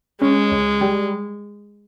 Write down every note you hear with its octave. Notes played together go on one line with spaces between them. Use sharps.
G#3 C#4
C#2
G3